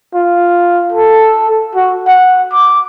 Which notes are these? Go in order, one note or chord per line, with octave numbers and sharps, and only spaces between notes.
F4
A4
F#4
F#5
D6